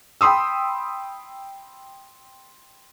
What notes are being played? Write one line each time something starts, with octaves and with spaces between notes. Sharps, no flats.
G5 B5 C6 D#6 E6